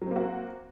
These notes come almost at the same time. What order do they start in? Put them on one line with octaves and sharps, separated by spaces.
F#3 C4 A#3 F#4